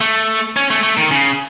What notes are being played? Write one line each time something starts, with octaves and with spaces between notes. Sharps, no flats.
A3
C#4
A3
A3
D#3
C#3